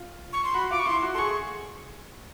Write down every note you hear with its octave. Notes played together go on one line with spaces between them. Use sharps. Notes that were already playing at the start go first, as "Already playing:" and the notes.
Already playing: F4
C#6
C6
F#4 B5
F4 D6
C#6
E4 C6
F#4
A4 C6
G#4 C#6